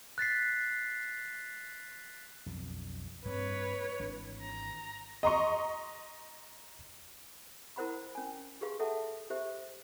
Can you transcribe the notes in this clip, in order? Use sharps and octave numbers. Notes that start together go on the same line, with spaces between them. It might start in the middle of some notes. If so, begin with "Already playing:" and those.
F#6 A6 B6 C7
B1 F2 D3
G2 G3 C4 B4 C#5
G#1 E3 D4
A#5
D#5 A#5 C6 C#6
E4 A#4 C5 F#5 B5 C6
C#4 G#5
G4 G#4 B4 F5 C6
A4 E5 F#5 A5
G4 C5 E5